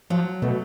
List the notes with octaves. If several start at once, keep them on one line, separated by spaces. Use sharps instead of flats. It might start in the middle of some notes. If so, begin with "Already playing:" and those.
F3 F#3
B2 A3